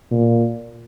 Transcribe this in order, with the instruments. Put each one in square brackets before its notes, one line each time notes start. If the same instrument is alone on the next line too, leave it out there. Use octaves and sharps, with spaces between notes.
[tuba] A#2